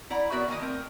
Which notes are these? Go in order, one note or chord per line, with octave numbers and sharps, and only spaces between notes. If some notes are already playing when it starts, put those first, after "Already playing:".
E4 D5 F#5 A#5
B3 F#4 A#4 C#5 D5 E5
D#3 E3 A#3 A#4 D#5
A3 C4 A#4